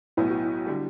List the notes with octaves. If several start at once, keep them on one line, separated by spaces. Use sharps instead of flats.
B1 A2 F#3 B3 E4
F#4
E4
D3 G3